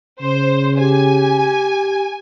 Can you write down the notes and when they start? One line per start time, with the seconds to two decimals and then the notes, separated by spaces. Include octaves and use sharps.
0.21 C#3 C5
0.79 G4 G#5